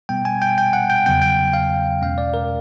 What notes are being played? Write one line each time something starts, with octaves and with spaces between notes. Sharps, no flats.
B2 G3 B3 G5
G#5
G5
G5
F#5
G5
E2 C#3 F#3 B3 G5
G5
F5
E2 B2 G#3 C#4 F5
D5
A#4